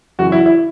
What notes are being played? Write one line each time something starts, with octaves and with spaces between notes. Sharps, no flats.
F#2 C#3 E3 F#4
E4
E4